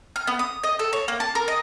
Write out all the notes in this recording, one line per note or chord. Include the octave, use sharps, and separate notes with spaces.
F6
B3
D#6
D#5
A4
C#5
A#3
A5
A#4
D#5